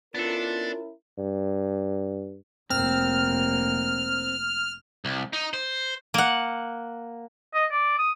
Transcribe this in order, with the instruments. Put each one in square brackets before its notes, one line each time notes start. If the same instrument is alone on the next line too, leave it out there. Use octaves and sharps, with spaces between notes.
[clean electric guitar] B3 A4 [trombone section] C#4 E4 A#4 [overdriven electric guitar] D4 [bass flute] F4
[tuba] G2
[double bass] F1 A#3 [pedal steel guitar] C4 [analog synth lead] F6
[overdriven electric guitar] C2
D#4
C5
[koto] A#3 F#5
[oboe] D#5
D5
D#6